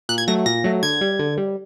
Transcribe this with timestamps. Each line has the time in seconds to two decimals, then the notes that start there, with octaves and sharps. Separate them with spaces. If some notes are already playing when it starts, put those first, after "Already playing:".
0.09 A#2 F#6
0.18 G#6
0.28 F#3 A3 A#6
0.46 A#2 A#6
0.64 F#3 A3
0.83 D3 G#6
1.01 G3
1.19 D3
1.38 G3